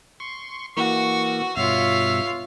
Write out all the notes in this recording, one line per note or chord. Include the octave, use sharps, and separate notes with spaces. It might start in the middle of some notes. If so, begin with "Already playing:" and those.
C6 C#6
E3 A#3 F#4 C#6
G2 B2 F4 C#5 E5 F5